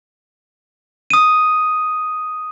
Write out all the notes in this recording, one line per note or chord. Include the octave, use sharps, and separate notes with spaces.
D#6 D#7